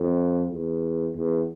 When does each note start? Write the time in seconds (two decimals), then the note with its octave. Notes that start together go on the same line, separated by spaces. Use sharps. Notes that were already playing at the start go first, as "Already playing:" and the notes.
Already playing: F2
0.52 E2
1.15 E2